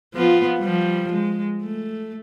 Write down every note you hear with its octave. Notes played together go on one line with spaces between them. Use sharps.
F3 B3 F4
F3 G3
G#3
A3